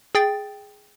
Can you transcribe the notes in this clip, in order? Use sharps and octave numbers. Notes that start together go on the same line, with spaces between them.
G#4 G5 A6